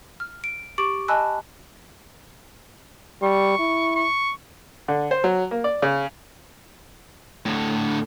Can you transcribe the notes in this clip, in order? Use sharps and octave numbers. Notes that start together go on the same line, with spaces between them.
F6
D7
G4 C#6 D6 A6 D7 F#7
D#5 G#5 A5 B5 E6 F#6
G3 C#6
E4
C#6
D3
C5
F#3
A#3
D5
C#3
A2 D3